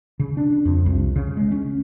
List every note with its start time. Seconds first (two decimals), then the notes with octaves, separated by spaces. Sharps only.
0.20 C#3
0.37 D4
0.65 F2
0.86 C2
1.16 C#3
1.37 G#3
1.52 C#4